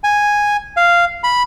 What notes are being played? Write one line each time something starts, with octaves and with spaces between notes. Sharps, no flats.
G#5
F5
B5